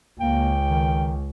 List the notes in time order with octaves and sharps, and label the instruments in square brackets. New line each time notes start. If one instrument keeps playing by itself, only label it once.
[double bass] C#2 [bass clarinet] A#3 [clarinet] G5
[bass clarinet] D#3